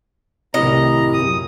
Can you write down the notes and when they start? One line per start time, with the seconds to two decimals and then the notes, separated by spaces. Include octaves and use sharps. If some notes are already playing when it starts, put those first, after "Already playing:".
0.54 C2 A2 D#3 C4 E4 G4 D#5 A#5
1.14 F#2 A#2 D#6